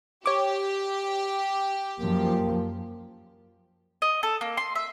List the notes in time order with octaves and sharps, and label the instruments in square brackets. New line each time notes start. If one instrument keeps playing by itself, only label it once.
[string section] G4 [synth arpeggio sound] C#5 D6
[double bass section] F#2 F3 [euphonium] A#3
[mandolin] D#5
A4
A#3
C6
E5